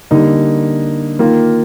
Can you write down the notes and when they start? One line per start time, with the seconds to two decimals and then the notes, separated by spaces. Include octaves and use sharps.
0.11 D3 G3 A#3 D#4
1.19 D#3 A#3 F4